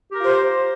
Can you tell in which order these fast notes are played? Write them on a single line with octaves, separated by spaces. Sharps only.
G4 A#4 F4 C5